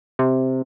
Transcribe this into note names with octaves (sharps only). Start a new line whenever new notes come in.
C3